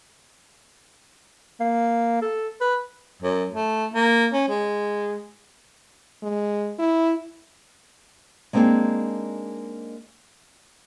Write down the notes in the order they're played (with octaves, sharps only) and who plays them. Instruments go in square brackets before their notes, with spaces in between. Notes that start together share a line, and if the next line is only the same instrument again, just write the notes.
[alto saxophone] A#3
A4
B4
[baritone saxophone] F#2
A3
A#3
C#4
G#3
[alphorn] G#3
E4
[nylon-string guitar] G#3 A#3 C4 D4 D#4 G#4